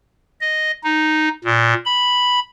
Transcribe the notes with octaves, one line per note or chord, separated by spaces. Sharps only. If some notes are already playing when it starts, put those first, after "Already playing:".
D#5
D#4
A#2
B5